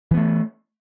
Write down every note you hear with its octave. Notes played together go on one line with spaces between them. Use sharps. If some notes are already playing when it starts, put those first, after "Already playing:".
E3 A3 B3